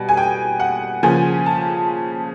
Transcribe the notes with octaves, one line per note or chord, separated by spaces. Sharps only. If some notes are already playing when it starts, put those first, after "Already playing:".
Already playing: B2 G3
G#5
G5
F#5
C#3 F3 A#3 G#5
A5